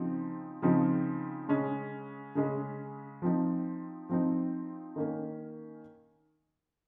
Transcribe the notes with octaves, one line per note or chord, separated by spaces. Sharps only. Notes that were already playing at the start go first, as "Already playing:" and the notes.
Already playing: C#3 F3 C4 D#4
C#3 F3 C4 D#4
C#3 G#3 C#4
C#3 G#3 C#4
F3 C4 D#4
F3 C4 D#4
D#3 A#3 C#4